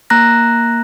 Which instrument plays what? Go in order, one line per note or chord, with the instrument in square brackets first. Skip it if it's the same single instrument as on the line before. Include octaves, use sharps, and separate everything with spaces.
[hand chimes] A#3 A#5 F#6 A#6